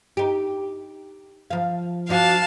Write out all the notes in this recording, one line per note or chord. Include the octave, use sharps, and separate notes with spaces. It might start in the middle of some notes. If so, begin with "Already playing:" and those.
D#4 G4
F3 F5
F3 D4 F#4 F5 A5